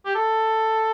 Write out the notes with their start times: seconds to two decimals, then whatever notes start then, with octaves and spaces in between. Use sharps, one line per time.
0.06 G4
0.15 A4